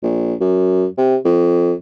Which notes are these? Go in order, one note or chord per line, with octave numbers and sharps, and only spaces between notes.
A#1
F#2
C3
F2